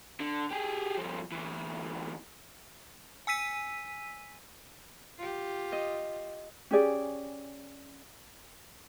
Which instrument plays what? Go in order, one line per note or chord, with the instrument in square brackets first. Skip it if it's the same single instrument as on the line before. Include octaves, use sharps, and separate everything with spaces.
[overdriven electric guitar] D3
G4 G#4
G2 F3
D2 E3
[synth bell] G#5 E6 B6 D#7
[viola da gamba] F4 G4
[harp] D#5
[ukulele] C#4 G4 G#4 D5